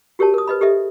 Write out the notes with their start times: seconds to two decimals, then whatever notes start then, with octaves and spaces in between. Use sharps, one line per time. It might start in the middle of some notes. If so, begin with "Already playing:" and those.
0.19 F#4 G4 A#4 C#5 A5
0.34 A#4 D#6
0.48 B4 D#5 B5
0.61 G4 A4 D#5 E5